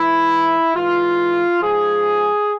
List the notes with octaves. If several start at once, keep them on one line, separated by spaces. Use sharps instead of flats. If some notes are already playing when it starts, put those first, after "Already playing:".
Already playing: G#2 E3 E4
G#2 E3 F4
G#2 F3 G#4